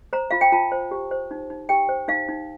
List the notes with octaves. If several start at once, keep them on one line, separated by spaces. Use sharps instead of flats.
C5 A#5
F4 F5
G5
F4 A5
C5
G4
C5
D#4
D#4
G4 G5
C5
D#4 F5
D#4